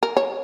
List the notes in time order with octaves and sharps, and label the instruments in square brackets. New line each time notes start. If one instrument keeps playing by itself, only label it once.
[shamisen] A#4
C#5